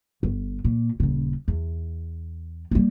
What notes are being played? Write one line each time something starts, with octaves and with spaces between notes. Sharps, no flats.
G1
A#2
D#1 C#3
E2
G3 A#3